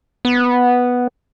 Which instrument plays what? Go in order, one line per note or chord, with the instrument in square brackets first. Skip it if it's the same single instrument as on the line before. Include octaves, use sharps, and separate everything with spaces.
[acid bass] B3